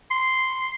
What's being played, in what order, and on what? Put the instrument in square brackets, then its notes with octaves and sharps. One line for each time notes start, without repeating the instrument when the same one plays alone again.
[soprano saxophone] C6